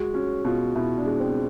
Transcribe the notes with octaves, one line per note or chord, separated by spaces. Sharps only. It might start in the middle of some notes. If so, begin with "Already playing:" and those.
Already playing: G#3 F#4
C#4 F#4
B2 F4
B2 E4
D4
G#3
C4